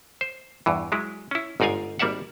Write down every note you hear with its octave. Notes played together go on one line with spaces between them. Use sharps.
C5
E2 G2 E3
F#3 G#3 E4
C#4 E4
G1 G#2 D#4 D5 F5 G#5
G#1 G3 A#3 D5 E5 F#5